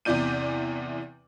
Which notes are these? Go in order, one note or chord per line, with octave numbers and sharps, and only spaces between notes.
E2 C3 E3 D5 G6 D#7